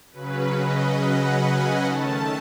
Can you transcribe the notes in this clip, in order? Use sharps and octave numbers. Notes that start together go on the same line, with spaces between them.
C#3 F#3 C#4 B4
D#5
F#5
G#5
D#3 A3 C#4 A5